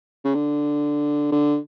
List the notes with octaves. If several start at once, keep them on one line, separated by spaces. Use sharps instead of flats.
C#3
D3
D3